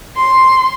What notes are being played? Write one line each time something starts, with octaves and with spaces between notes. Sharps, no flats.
C6